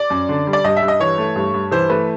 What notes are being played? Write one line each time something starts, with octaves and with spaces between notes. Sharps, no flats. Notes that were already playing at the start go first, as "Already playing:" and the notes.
Already playing: D5
F#2
D3
G3
D5
G2 D#5
E5
G2
D#5
E3 C#5
A3
G2
G2
E3 C5
A3 B4